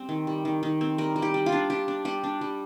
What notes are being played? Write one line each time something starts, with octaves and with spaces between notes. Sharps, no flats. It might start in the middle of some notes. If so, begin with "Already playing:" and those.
Already playing: G3 C4
D#3
G3
D#3
D#3
C4
G3 A#4
G3
G4
G3
F4
D4
D4 G4
D4
G3 G4
D4
G3